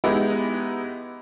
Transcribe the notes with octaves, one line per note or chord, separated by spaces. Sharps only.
G#3 B3 D#4 E4 G4